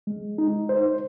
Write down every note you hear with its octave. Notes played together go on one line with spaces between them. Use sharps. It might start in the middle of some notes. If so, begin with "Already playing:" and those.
G#3
D#4
C5